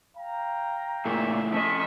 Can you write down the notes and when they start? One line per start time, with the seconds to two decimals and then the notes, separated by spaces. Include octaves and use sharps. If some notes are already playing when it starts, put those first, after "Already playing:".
0.18 F5 G5 A#5
1.06 A#2 A3 E4 G#4 E5
1.53 F3 C#4 D#5 E5 C#6